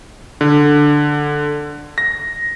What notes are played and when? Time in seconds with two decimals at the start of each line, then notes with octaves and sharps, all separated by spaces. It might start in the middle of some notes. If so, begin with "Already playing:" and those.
0.41 D3
1.98 A#6